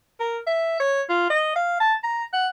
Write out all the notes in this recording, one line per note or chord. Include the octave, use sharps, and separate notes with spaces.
A#4
E5
C#5
F4
D#5
F5
A5
A#5
F#5